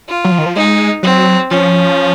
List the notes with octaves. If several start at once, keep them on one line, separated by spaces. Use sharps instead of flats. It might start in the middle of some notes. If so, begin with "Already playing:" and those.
F4
F#3
F3
D#3
F3
G#3 D#4
F#3 C4
F3 C#4